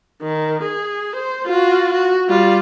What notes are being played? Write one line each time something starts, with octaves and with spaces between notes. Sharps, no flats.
D#3
G#4
C5
F4 F#4
F#4
G3 F4